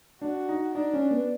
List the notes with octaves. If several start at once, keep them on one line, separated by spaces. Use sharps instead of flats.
D4 F#4
D#4
D4 D#4
C#4
B3